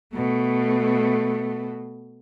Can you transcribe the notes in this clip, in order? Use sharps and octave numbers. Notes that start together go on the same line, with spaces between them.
B2 A3